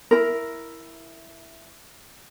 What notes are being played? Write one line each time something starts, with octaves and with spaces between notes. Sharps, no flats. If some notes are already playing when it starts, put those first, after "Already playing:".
E4 A#4